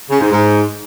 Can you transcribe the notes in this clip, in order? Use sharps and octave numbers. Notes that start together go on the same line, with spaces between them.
C#3
G#2
G#2